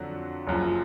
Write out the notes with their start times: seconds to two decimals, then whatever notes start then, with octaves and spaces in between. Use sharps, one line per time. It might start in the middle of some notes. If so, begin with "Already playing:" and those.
Already playing: F2 D3 F#3 F#4
0.47 F#1 F#2 F3